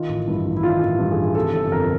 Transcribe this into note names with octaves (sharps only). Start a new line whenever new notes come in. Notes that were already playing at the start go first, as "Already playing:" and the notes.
Already playing: D#3 F4
A1
G2 E4
A1
E4
D#3 F4
A1
G2
A1 G#4
C3 A4
G1 A4
F2 A#4